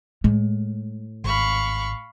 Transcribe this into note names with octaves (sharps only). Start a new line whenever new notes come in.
A2 G#3
G#1 F5 B5 C#6